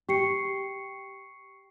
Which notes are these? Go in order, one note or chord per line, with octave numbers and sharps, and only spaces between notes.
G4 C#6 C7 C#7